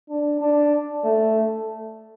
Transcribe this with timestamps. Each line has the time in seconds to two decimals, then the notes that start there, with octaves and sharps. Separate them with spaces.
0.10 D4
0.41 D4
1.04 A3